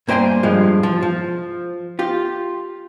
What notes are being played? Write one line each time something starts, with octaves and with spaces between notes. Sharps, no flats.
G2 A#3 C5 G5 G#5 C6
G2 F3 G#3
F3
F3
F4 G4